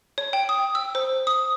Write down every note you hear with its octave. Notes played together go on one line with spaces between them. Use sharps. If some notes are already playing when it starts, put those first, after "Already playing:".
C#5
G5
D#6
E6
C5
D#6